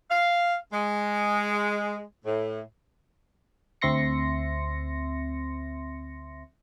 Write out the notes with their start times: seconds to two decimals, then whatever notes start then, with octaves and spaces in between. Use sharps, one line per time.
0.10 F5
0.73 G#3
2.25 A2
3.82 D2 C4 E5 C6 A#6 C#7